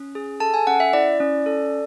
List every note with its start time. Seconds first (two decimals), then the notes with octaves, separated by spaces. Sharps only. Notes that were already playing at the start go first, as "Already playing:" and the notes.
Already playing: C#4
0.15 G#4
0.40 A4 A5
0.54 G#5
0.67 C#4 F#5
0.80 E5
0.93 E4 D5
1.20 C#4
1.46 A4